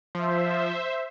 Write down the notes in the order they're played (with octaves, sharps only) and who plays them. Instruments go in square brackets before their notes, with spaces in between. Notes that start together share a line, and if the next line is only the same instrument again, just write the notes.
[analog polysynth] F3 [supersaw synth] C5 E5